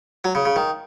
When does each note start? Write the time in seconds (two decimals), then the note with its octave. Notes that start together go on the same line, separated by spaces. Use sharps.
0.24 F#3
0.35 C#3
0.45 C#3
0.56 D#3